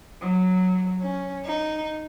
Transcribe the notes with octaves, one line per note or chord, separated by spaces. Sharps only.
F#3
C#4
D#4